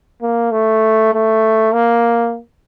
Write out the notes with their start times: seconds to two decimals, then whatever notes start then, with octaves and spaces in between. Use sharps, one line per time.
0.22 A#3
0.52 A3
1.14 A3
1.74 A#3